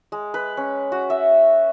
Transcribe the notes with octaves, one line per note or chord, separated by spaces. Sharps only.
G#3
B4
C#4
F#4
E5